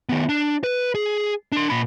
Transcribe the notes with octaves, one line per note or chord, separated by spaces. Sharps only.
D#3 B3
D4
B4
G#4
D4 C6
A#2 B5